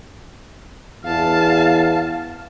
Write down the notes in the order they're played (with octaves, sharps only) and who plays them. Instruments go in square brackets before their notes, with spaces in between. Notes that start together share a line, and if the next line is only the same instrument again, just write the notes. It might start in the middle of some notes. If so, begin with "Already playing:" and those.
[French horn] E2 [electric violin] F5 A5